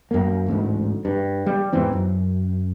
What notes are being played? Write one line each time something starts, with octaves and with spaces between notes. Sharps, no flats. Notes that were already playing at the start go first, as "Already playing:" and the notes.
F#2 A#3
A1 D2 G#2
G2
G3
E2 G#2 E3 C4
F#2